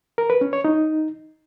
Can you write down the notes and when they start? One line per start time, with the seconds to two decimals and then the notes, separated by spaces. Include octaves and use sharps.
0.18 A#4
0.30 B4
0.41 C#4
0.53 C#5
0.65 D#4